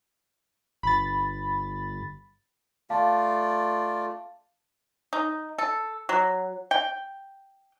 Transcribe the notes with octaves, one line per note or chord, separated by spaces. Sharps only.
G1 B5 A6
A3 F4 D5 F5 A5
D#4
A4
F#3
G5